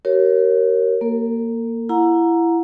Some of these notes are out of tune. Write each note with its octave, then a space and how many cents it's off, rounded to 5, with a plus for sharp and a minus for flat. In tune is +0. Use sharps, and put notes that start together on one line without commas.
G4 -45 A#4 +0 C#5 -15
A#3 +0 A#4 -45
E4 +20 F#5 -30 A#5 +0